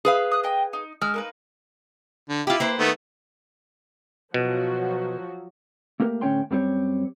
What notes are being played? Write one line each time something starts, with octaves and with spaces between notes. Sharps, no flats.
G#4 B4 F5
D#6 F#6
D#5 G5
D#4
G#3 E6 F6
A#3 D#4 B4
D3
E4 F4 G4
A#3 B4 C5
D#3 A3 B3
B2 F3 F#3 F#4
A3 A#3 G4 A#4
D2 A2 C#4 C#5 G5 C6
F#2 G3 C4 G4 C#5